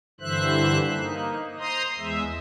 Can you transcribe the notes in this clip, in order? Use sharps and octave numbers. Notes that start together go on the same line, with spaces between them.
G2 D3 E3 C5 E5 F#6
A#3 D#4
C5 A#5 C6 D#6
E2 G#3 E5